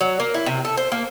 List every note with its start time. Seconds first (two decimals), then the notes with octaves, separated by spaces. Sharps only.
0.01 F#3
0.20 A#3
0.34 E4
0.46 C3
0.65 A4
0.77 C5
0.92 A#3